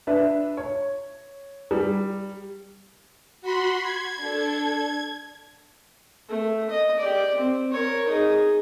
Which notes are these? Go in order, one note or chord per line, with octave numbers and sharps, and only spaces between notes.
D4 B4 E5
C#5
G3
F#4 B5 C6
G#6
D4 A4
A3
D#5
G4 D5
C4
A#4 C#5
D#4 G#4